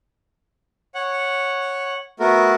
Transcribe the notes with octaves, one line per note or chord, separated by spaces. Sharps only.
C#5 F#5
A3 B3 F#4 A#4